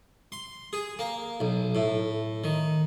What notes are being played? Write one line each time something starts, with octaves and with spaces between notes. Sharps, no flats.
C6
G#4
A#3
B1
A2
D#3